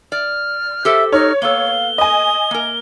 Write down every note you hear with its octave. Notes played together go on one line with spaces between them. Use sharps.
D5 F6
G4 A4 C5 E5
D#4 C#5 F6
A#3 B3 A4 F5 G7
D#5 G#5 D#6
A#3 A#4